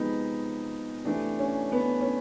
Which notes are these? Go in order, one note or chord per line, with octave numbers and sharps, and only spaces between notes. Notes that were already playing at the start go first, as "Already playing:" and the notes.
Already playing: C3 F3 G#3 B3 D#4
C3 E3 A3 D4
C#4
B3
C#4